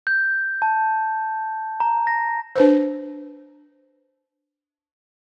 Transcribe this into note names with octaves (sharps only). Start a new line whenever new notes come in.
G6
A5
A#5
A#6
D4 B4 C5